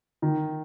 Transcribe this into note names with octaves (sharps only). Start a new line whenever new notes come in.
D#3